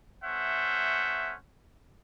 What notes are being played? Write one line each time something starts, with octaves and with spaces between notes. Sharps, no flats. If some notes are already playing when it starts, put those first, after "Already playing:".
A3 C#4 C5 E5 F#5